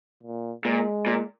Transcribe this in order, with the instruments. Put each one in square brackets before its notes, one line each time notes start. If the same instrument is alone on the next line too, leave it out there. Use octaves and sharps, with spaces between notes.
[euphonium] A#2
[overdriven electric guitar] A#2 [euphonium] G#3
[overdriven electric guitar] A#2